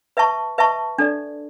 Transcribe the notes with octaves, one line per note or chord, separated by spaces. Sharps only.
B4 E5 A5 C#6
B4 E5 A5 C#6
D4 A4 D5